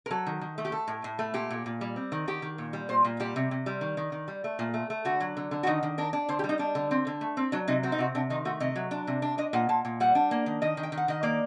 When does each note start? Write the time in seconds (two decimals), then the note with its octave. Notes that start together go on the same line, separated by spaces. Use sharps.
0.06 A#4
0.11 F#3 A4
0.27 D#3
0.41 D#3
0.58 A3
0.65 G4
0.72 A3 A4
0.88 A2
1.04 A2
1.19 A3
1.34 A#2 G4
1.51 A#2
1.66 A#2
1.81 G3
1.96 C4
2.12 D#3
2.28 D#3 G4
2.42 D#3
2.58 A#2
2.73 G3
2.89 A#2 C5
3.05 A#2
3.20 G3 G4
3.36 C3
3.51 C3
3.66 G3
3.81 D#3
3.97 D#3
4.12 D#3
4.28 G3
4.44 A3
4.59 A#2
4.74 A3
4.90 A3
5.05 D3 F#4
5.20 F#3
5.37 D3
5.51 D3
5.63 F#4
5.67 D#3 D#4
5.83 D#3
5.98 D4 A#4
6.13 D4
6.29 D3 C5
6.39 G4
6.44 G3
6.49 D#4
6.59 G3 D4
6.75 D3
6.91 C4
7.07 D3
7.21 A3
7.37 C4
7.52 F#3 D4
7.68 C3 D#4
7.83 C4 F#4
7.92 D#4
7.98 C3 F#4
8.15 C3 D4
8.30 D#3 D#4
8.45 A3 F#4
8.60 C3 D#5
8.76 F#3
8.91 D4
9.07 C3
9.22 D4
9.38 D4 D#5
9.53 A#2 F#5
9.69 A#2 A5
9.85 A#2
10.00 G3 F#5
10.15 D4
10.31 A#3
10.46 D#3
10.62 D#3 D#5
10.77 D#3
10.83 G5
10.92 D#3
10.97 F#5
11.08 D#3 D#5
11.23 A#3 D5